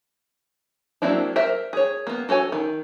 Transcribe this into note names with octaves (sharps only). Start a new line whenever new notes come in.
F#3 A#3 C4 D4 E4
A#4 C5 E5
G#4 C#5
A#3 B3
F#4 A4 C#5 G#5
D#3